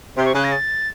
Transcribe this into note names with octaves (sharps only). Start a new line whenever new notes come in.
C3 C6
C#6
C#3 F#6
A#6
A6